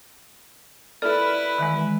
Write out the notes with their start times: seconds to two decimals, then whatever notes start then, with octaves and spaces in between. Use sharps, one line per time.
1.02 E4 A4 B4 D5 F6
1.58 D#3 E3 G#3